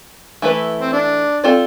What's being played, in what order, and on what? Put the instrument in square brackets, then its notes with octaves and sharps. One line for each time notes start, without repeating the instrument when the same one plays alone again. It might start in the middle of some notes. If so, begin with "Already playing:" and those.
[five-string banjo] E3 A3 E4 B4
[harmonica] C4
D4
[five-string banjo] C4 F4 A4 D5